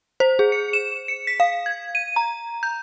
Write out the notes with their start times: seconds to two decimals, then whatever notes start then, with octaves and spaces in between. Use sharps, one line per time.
0.20 C5
0.39 G#4
0.52 C#7
0.73 E7
1.08 C#7
1.27 B6
1.40 F5
1.66 G#6
1.95 D#7
2.16 A#5
2.63 G6